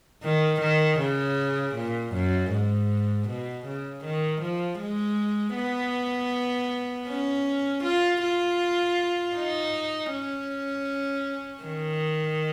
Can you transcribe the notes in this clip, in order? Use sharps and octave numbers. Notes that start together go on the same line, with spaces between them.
D#3
D#3
C#3
A#2
F#2
G#2
B2
C#3
D#3
F3
G#3
B3
C#4
F4
F4
D#4
C#4
D#3